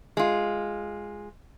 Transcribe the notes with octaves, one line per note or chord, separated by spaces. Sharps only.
G#3 F4